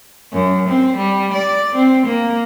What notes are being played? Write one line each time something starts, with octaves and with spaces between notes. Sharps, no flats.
F#2
C4
G3
D5
C4
A#3